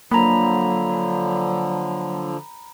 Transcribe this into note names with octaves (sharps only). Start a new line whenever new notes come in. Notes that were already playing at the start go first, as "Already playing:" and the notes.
D3 F3 F#3 A#3 A#5 B5